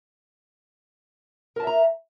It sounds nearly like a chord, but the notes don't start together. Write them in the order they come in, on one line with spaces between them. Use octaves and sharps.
A#4 A5 E5 A#5